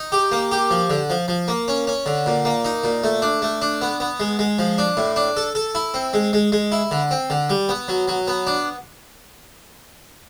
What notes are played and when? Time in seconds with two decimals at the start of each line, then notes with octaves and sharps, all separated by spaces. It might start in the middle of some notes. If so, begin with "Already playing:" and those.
Already playing: D#4
0.12 G4
0.32 A#3
0.51 G4
0.71 F3
0.90 D3
1.10 F3
1.28 F3
1.48 A#3
1.68 C#4
1.87 C#4
2.06 D3
2.26 A#2
2.45 A#3
2.65 D#4
2.84 A#2
3.04 A3
3.22 D4
3.42 A3
3.62 D4
3.81 B3
4.00 B3
4.20 G#3
4.39 G#3
4.59 F3
4.78 D4
4.97 A2
5.16 D4
5.37 A4
5.55 A4
5.75 E4
5.94 C4
6.14 G#3
6.33 G#3
6.52 G#3
6.72 E4
6.91 D3
7.11 C4
7.30 D3
7.49 G3
7.69 B3
7.88 F#3
8.08 F#3
8.28 B3
8.47 D4